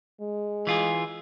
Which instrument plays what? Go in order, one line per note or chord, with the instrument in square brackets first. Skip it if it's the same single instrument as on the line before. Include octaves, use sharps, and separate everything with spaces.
[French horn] G#3
[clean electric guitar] E3 F4 G#4